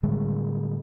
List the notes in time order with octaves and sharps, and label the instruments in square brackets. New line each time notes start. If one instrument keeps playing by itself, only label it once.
[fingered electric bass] A2 D3 G3 G#3